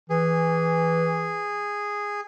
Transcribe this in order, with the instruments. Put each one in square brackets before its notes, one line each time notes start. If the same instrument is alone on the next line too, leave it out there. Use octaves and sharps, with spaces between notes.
[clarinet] E3 [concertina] G#4